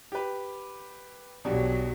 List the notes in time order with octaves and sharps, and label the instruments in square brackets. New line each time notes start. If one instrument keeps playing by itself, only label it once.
[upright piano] G4 B4
[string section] B1 F#3 [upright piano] B2 [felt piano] D4 G4